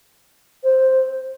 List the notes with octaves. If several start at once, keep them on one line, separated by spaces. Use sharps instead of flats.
C5